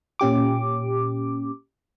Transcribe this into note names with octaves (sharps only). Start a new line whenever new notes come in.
A#2 C#4 G4 D6